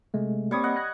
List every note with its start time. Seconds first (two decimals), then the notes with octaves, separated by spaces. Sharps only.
0.14 C3 G#3 A3
0.51 G3 A#3 C4 C#5 D#6
0.64 D#5 F#5
0.76 F#6 G#6 A#6